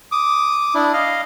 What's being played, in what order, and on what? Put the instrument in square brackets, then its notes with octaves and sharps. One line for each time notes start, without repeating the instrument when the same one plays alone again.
[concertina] D6 D#6
D4 E4
D#5 F5